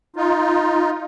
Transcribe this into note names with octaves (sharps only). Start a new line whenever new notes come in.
D#4 F4